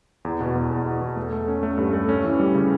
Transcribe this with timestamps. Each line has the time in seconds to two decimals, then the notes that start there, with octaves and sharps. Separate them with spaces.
0.25 E2
0.40 B2
0.55 E2
0.71 E2
0.86 E2
1.01 E2
1.17 A3
1.33 A3
1.48 C#4
1.63 A3
1.78 G2
1.93 A3
2.09 C#4
2.24 E3
2.40 G3
2.55 C#3